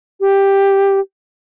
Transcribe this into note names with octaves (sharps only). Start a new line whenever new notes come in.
G4